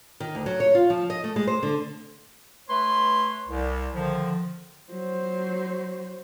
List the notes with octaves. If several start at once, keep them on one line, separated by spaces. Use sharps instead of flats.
D#3
D2
F#3
C#5
F4
F3
D#5
A3
G#3
C5
D3
A3 B4 C#5 C6
C2
D3 D#3 F3
F#3 C5